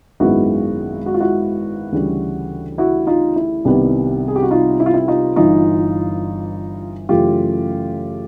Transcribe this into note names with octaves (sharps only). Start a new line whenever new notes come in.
G#1 F#2 D#3 G#3 B3 E4 F#4
F#4
F4
E4 F#4
D2 C#3 E3 G3
E4 F#4
D#4 F4
E4
C2 C3 D#3 G3 B3
G#4
G4
F#4
D#4 F4
E4
F4
E4
D#4 F4
G1 G2 E3 D#4 F4
F#2 C#3 E3 A3 F4 G4